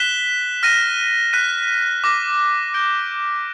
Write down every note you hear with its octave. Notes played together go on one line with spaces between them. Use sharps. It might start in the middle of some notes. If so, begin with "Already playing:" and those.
Already playing: F#6 B6 E7 G7
F6 A#6 D#7
F#6 B6 D#7
D6 F6 A#6
G6 A#6 D7 G7